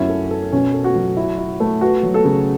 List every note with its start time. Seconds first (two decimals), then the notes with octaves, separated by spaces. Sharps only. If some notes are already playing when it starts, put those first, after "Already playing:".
Already playing: F#2 C#4 E4 F#4
0.09 A4
0.31 A4
0.52 B2 C#4
0.74 A4
0.84 F#4
0.96 F#3
1.17 E4
1.38 E4
1.60 A3
1.81 B3 F#4
2.03 F#3
2.14 A4
2.25 C#3